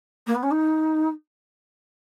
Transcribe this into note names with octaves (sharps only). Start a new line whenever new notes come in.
A#3
B3
C#4
D#4